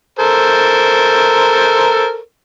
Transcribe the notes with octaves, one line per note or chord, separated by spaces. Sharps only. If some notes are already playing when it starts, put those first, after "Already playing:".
A4 A#4 C5